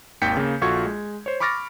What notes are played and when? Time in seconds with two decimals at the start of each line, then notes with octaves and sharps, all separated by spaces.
0.22 G#1 D#2 G5 G6 B6 C#7
0.37 C#3 A#3
0.61 A#1 F4 F#4 A4 C#6 G#6
0.85 G#3
1.26 C5 C#5
1.40 B5 C#6 D6 F6 A6 A#6